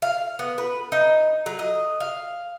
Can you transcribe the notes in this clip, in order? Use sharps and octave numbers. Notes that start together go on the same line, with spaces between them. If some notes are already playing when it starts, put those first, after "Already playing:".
F5
B3
B4
D#4
F#3
D#5
F5